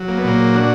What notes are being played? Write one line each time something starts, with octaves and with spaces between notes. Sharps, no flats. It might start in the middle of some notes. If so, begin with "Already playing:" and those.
Already playing: F#3
A#3
B3
A#2 A#3
D4 F#4